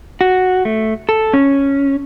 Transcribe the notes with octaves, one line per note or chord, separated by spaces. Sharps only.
F#4
A3
A4
C#4